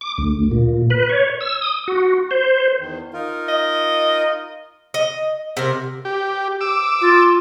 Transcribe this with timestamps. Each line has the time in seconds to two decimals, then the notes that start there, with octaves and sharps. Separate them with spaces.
0.01 D6
0.18 D2
0.51 A#2
0.90 B4
1.09 C#5
1.41 E6
1.61 D#6
1.88 F#4
2.31 C5
2.79 E2 D#3
3.13 D#4 F4 A#4
3.48 D#5
4.94 D#5
5.57 C3 A#4
6.05 G4
6.61 D6 E6
7.01 F4